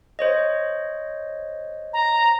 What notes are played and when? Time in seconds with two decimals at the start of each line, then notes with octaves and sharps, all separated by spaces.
0.19 C5 C#5 D#5
1.93 A#5